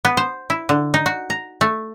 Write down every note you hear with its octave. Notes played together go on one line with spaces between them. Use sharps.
B3
C5
E4
D3
D#4
F#4
A#5
A3